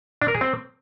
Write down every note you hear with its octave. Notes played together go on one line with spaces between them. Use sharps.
D4
A#4
G#4
C4